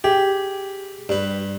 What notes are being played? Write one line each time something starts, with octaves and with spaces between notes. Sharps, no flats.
G4 G#4
G2 B4